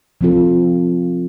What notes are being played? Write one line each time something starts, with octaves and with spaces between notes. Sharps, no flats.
F3 C4 F4 A4